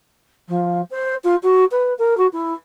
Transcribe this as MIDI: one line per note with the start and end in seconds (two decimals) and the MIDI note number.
0.48 0.81 53
0.90 1.15 72
1.24 1.35 65
1.43 1.64 66
1.71 1.93 71
1.98 2.17 70
2.17 2.27 66
2.33 2.53 64